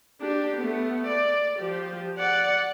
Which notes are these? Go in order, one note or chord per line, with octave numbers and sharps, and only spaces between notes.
D4 G4
A3 B3
D5
F3 G4
D5 F#5